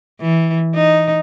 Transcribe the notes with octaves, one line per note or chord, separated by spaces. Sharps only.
E3
D#4